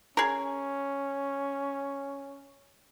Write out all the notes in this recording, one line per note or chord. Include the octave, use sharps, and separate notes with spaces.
C#4 G#4 A#4